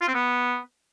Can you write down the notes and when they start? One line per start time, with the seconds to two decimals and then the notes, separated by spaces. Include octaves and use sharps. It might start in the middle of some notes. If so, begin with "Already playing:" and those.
0.01 F4
0.08 C4
0.14 B3